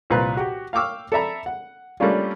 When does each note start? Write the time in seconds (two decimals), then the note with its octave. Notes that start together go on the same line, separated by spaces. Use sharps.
0.10 C2 A#2 B4 F#6
0.37 F#4 G4
0.73 F5 G5 C#6 D6 E6 F6
1.12 A4 D5 E5 A#5 B5
1.46 F#5
2.00 G3 A3 A#3 C#4 D4 F4